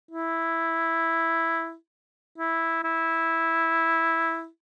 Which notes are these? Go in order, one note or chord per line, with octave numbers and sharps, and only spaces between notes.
E4
E4
E4